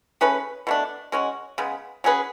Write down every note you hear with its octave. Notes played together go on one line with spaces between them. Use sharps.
A3 C#4 G#4 B4
B2 A3 D4
G#3 C#4 F#4
C#3 G#3 B3
F#3 C#4 G#4 B4